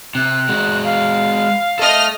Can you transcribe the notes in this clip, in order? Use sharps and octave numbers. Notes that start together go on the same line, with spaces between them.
C3 F#6
G#3 F#4
F5
A4 D#5 E5 F6